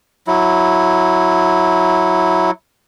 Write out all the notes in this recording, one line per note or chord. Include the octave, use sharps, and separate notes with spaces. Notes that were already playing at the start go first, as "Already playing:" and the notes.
F#3 E4